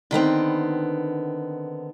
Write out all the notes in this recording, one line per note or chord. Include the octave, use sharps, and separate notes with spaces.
D3 D#3 B3 C4